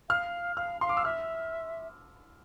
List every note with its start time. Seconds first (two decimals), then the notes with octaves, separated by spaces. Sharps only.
0.09 F5 F6
0.57 F5 F6
0.81 F5 C6
0.89 D6
0.97 E6
1.05 E5 F6